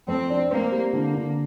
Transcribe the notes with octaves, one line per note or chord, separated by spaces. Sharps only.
F2 C4
D4
A#3 C4
G3
D3 A#3
D3